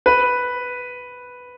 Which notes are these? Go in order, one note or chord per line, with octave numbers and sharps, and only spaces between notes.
B4